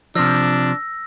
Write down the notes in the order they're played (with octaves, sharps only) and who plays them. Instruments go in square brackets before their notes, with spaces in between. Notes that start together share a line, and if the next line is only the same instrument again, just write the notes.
[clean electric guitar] C3 F3 [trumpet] D4 [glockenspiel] E6 A#6